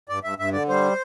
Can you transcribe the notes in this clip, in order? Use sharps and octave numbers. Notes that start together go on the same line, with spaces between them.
G2 D5
G2 E5
G2 E5
D3 D5
G3 C5